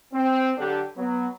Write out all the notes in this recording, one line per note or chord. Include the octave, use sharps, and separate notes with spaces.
C4
D3 F#3 D4 G4 A4
F#3 B3